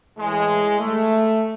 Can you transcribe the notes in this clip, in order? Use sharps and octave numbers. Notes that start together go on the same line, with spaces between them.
A2 E3 G#3
A3